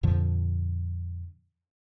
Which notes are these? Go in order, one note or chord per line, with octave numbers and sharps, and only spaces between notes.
F2 A#2 D3 F3